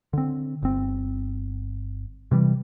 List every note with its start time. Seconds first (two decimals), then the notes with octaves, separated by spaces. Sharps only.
0.13 D3 C4
0.62 G1 C4
2.31 C3 E3 G3